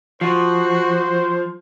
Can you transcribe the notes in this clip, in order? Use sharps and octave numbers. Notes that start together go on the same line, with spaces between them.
F3 F#4 C5